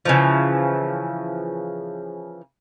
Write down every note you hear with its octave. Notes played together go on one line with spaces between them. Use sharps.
C#3 E3 F3